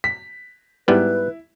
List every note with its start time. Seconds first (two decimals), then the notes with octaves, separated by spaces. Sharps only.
0.04 B6
0.88 G#2 G3 B3 E4 B4